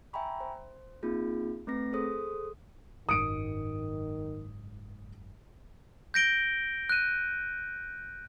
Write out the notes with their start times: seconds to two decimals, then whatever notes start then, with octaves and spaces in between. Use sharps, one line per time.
0.13 E5 G5 G#5 A#5 B5 C#6
0.40 C5
1.03 A#3 C4 D#4 F4 G#4
1.67 A3 C4 B4 A#6
1.93 G#4 A4 C5 D#6
3.09 F#1 G#2 D#3 D#6 C#7 D7
6.14 G6 A#6 D7 G7
6.89 F#6 D#7